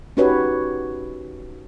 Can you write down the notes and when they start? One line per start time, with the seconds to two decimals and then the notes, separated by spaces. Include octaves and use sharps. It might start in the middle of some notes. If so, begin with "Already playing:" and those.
0.17 C#4 D#4 F#4 G4 B4 C#5